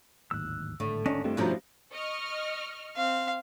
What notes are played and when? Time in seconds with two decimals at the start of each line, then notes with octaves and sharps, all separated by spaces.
0.31 D1 G#1 D#2 E6 F#6
0.80 G#1 A2 D3 A3
1.06 D#2 C#4 D4 D#5
1.24 G2 A3 C4 D4 E4 F4 G4
1.37 B2 F3 G3 A3 C#4 A#5
1.92 D#5 C#6 F6
2.96 C4 F5